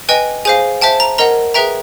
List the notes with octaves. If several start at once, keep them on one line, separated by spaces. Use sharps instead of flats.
B4 D#5 G5 G#5
G#4 C5 F5 G#5
C5 E5 G5 A5
A#5
A#4 D#5 F#5 A#5
G#4 B4 E5 G5 A#5